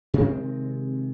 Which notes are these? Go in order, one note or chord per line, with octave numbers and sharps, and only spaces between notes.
C3 D#3 G#3 C4